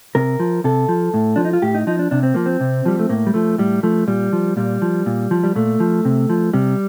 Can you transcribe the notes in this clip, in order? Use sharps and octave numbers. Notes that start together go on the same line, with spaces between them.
C3 A#4
F3
C3 A4
F3
A2
F3 D4
D#4
F4
A2 G4
D#4
F3 D#4
D4
C3 D4
C4
F3 A#3
C4
C3
F3 G3
A3
A2 A#3
G3
F3 A3
A2 G3
F3 A3
A#2 G3
F3
A#2 G3
F3
A#2
F3
G3
A#2 A3
F3
C3
F3
C3 G3